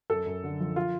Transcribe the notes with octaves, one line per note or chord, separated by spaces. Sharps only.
F#2 A4
F#2
D3
F3
F4